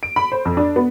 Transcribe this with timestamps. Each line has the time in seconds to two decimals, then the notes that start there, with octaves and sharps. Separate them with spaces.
0.03 D7
0.16 B5
0.32 C5
0.45 F2
0.57 D4
0.76 B3